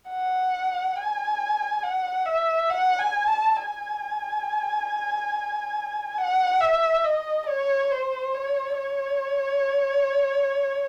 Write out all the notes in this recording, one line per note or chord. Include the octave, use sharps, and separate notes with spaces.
F#5
G#5
F#5
E5
F#5
G#5
A5
G#5
F#5
E5
D#5
C#5
C5
C#5
C#5